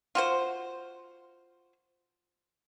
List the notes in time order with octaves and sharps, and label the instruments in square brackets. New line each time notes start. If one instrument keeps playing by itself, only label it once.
[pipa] F4 F#4 C5